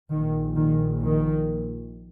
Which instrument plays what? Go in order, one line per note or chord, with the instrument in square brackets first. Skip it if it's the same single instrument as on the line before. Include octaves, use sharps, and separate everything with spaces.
[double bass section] A#1 A#2 D#3
D#3
D#3